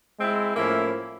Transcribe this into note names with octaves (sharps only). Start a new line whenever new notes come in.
G#3 C4 E4
A2 F3 A#3 C#4 E4